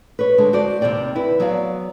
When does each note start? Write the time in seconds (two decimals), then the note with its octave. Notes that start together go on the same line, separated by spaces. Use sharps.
0.19 B4 C#5
0.38 D3 G#3
0.53 F#4 C5 D5
0.81 D#2 C3 G#3 C5 D5 G5
1.15 E4 B4
1.40 F#3 B3 F#4 D5 F5